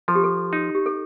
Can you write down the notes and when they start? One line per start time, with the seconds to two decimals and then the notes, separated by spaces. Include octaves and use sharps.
0.08 F3 A4
0.15 G4
0.24 A4
0.53 D#4
0.75 G4
0.86 A4